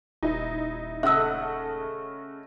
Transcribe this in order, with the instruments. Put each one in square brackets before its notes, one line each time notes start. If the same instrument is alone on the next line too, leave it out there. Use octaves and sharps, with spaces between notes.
[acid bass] D#1 [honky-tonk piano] D#4 E4
[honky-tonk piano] C#3 [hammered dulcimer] A3 D#5 F#5 [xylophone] E5 E6